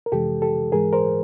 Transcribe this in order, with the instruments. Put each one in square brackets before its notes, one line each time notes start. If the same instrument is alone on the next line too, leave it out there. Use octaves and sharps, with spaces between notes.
[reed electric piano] A#4
F2 C3 E3 G#3 G4 A4
G4 A4
G#2 E3 G#3 G#4 A#4
A#4 C5